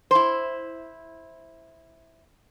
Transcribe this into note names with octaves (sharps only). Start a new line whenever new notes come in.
E4 C5